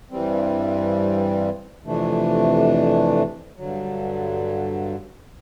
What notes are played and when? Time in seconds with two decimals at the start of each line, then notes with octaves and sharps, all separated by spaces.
0.11 G2 E3 G3 C4
1.84 F2 C3 E3 A3 D4
3.57 G2 D3 F#3